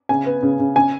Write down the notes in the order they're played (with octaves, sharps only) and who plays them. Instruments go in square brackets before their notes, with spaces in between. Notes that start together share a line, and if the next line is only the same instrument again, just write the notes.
[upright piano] C#3 G#5
B3
C#3
C#3
G#5